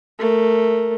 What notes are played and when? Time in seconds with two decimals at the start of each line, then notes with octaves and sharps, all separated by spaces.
0.19 A3 A#4